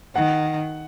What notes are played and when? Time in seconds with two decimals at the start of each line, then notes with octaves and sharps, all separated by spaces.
0.15 D#3 F#5